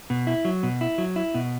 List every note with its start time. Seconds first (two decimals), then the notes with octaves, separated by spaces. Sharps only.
0.10 B2
0.27 E4
0.45 F#3
0.63 B2
0.81 E4
0.98 F#3
1.16 E4
1.34 B2